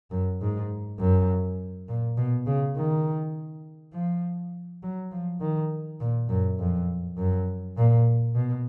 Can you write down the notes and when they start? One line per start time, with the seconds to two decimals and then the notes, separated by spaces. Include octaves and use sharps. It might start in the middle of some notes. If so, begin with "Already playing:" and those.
0.11 F#2
0.42 G#2
0.99 F#2
1.88 A#2
2.17 B2
2.46 C#3
2.76 D#3
3.93 F3
4.83 F#3
5.12 F3
5.40 D#3
6.00 A#2
6.29 F#2
6.59 F2
7.18 F#2
7.77 A#2
8.35 B2